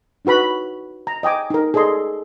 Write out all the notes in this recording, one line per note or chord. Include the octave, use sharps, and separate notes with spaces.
D4 D#4 F#4 B4 B5
A#5
D#5 G5 G#5 D6
D#4 A#4
G#4 A4 D5 D#5 C6